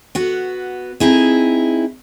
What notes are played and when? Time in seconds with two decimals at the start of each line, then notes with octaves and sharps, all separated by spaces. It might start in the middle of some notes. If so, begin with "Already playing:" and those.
0.15 B3 F#4 F#5
1.00 C4 D#4 E4 G#4